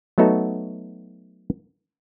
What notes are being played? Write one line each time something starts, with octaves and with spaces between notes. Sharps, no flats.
F#3 A3 B3 D#4 F#4 A4